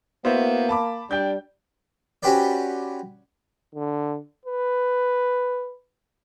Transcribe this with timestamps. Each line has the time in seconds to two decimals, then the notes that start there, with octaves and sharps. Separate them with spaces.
0.25 A#3 B3 E4 F#4 C5
0.69 A5 B5 D6
1.11 G3 D4 G5 G6
2.23 C#4 F#4 G4 B4 C5 D5
3.75 D3
4.45 B4